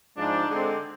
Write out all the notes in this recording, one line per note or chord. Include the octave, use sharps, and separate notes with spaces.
G#2 F3 G#3 D4
D3 G#3 C4